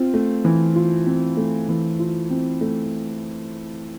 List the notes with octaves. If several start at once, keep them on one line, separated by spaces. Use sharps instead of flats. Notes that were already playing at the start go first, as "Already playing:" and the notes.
Already playing: C4 F4
A3
E3
F4
C4
A3
E3
F4
C4
A3